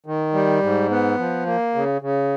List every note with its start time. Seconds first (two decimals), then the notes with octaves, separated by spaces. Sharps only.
0.06 D#3
0.33 G3
0.62 G#2
0.90 B3
1.18 F3
1.46 A#3
1.75 C#3
2.02 C#3